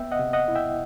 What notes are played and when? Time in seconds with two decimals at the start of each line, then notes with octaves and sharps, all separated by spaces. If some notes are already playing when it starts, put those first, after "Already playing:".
Already playing: B3 E5 G5
0.12 D#5 F#5
0.19 C3
0.33 D#5 F#5
0.48 E4
0.55 E5 G5